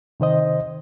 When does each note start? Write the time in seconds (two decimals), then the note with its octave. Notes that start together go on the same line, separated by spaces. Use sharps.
0.20 C3 D#3 C5 D#5